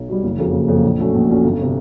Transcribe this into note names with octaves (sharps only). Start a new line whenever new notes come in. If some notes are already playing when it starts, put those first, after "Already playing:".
Already playing: B1
B2 G3
F#1
F2 C#3 F#3 A#3
F#1
F2 C#3 F#3 A#3
A#1
A#2 F#3 A3 C#4
A#1
A#2 F#3 A3 C#4
G1
C3